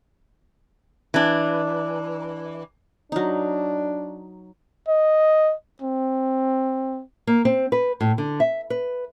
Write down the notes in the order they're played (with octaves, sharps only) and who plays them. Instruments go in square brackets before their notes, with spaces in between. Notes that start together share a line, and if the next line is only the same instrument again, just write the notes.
[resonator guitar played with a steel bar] E3 D4
[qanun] F#3 D#4 [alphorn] D4
[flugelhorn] D#5
C4
[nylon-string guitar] A#3
C4
B4
A2
D3
E5
B4